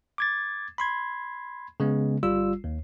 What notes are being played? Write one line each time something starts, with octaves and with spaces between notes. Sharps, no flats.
D6 G#6 A6
B5 C6 G#6
C#3 G#3 B3
G1 G3 F4 E6
D#2